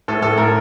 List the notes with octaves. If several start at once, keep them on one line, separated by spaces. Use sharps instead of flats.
A2 A4
A2 A4
A2 A#4